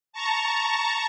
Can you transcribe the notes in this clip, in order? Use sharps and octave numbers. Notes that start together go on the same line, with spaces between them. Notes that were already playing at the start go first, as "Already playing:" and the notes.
A5 A#5 C#6